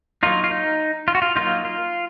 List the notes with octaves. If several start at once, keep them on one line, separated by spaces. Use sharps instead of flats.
F#3 A#3 D#4 F4
F4
D#4
F4
F#4
F4
F#3 A#3 D#4 F4
F4